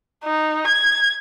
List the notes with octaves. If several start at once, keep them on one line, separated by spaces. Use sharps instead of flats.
D#4
G#6